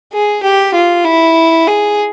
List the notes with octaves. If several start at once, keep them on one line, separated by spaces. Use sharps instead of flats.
G#4
G4
F4
E4
G#4